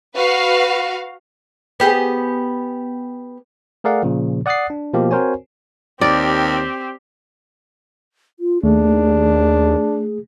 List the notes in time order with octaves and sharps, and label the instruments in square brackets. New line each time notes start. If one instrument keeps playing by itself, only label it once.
[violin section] F#4 B4 F5
[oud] B3 G4 G#4
[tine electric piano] A3 G#4 A#4 D5 F5 F#5
A#2 C#3 F3
D5 F#5 D#6 F#6 A6 C7
D4
B2 F3 A#3 G4
C4 F#4 A#4 C5 C#5 G#5
[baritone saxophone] D#2 [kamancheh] C4 G4 [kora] D5
[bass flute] F4
[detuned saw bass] D#2 [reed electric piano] A3 [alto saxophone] D4 [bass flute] G#4